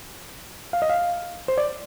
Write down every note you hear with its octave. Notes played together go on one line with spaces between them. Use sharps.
F5
D#5
F5
C5
D5